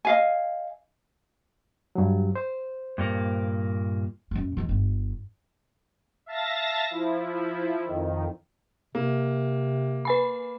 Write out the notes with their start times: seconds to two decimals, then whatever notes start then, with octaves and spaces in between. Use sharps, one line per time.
0.05 D#5 F5 G#5
1.95 G2 F#3
2.35 C5
2.98 G2 A#2 A#3
4.31 F#2 A#3
4.57 D#2 E3
4.69 G1
6.26 E5 F5 A5 A6 A#6
6.90 F3 E4
7.86 F2 D#3
8.95 C3 A#3
10.05 B4 G#5 B5